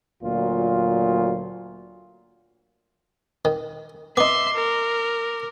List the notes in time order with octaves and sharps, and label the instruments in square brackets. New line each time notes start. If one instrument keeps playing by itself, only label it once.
[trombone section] D2 A#2 F#3 F4
[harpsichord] D#3
[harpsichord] B3 D#4 [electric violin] E5 C6 [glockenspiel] D6
[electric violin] A#4